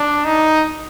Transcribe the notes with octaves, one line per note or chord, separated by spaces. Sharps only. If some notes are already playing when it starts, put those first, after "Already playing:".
Already playing: D4
D#4